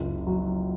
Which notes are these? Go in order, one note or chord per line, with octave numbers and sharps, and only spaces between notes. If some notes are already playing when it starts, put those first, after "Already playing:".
Already playing: F#1 C#2
F#3